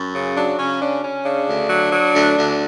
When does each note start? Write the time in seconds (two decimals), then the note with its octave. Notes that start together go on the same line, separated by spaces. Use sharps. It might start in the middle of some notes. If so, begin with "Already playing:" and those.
Already playing: F#2
0.15 C#3
0.37 F#3 D4
0.59 C#3 C#4
0.82 C#4 D4
1.04 C#4
1.25 C#3 D4
1.48 D2
1.70 F#3
1.92 F#3
2.14 D2
2.37 D2